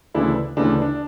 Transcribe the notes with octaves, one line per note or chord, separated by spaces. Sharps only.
D2 C#3 E3 D4 E4
D2 C#3 E3 D4
D4